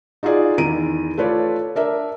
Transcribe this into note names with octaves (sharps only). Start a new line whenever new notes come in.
D#4 F4 F#4 G#4 D5
E2 D#3 E4 A#5 D7 D#7
A3 F4 B4 C#5 D5
D4 A#4 E5